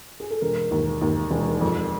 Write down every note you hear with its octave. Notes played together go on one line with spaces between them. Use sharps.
G#4
A4
E1 A#4
D#2
D#2
E1
F2